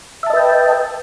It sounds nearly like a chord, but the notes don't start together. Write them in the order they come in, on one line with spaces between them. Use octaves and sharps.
E5 A5 D#5 B4 G5